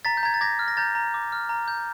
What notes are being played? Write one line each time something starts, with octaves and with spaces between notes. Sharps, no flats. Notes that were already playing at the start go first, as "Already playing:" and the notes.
A#5 A6 B6
G6
A#5 G#6
A6
D6 G#6 A#6
F6
A#6
A#5 G6 A6
A#5
D6
F6
A#5
G6